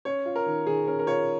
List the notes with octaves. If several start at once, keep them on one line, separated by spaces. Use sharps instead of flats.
C#4 C#5
F4
A#4
D#3
D#3 G#4
C#4 A#4
A#4
F4 C#5